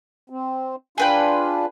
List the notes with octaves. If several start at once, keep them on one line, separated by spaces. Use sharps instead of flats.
C4
D4 F4 G#4 B4 G5